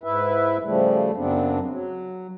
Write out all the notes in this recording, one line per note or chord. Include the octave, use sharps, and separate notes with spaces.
G#2 E4 B4 E5
C#3 F3 G3 A3
F#2 C#3 F#3 B3 C4 D4
F#3